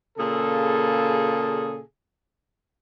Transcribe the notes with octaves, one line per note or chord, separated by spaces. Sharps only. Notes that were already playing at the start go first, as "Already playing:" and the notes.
A#2 C#3 G#4 A4